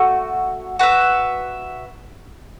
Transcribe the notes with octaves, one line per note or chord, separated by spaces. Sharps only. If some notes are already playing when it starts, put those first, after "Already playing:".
Already playing: A3 F#4
F#4 B4 E5